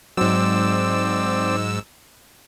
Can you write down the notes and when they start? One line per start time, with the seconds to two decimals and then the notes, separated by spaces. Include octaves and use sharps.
0.17 G#2 F#3 C4 D5 E6